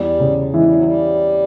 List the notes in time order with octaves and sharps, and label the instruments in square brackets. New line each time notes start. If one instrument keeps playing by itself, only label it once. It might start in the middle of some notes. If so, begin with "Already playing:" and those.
Already playing: [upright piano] E2 [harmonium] G3
[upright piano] C#3
[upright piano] E3 [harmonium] G#3
[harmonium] G3
F#3
G3